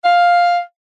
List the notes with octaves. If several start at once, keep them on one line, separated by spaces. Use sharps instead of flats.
F5